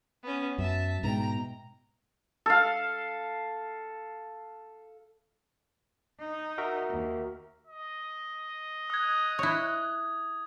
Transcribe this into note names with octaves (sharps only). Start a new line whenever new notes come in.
B3 C#4
F#2 E5 A5
G#2 B2 G#3 G5 A#5
A4 F5
D#4
F#4 A#4 E5
D#2
D#5
D#6 F#6 G#6
E4 C#5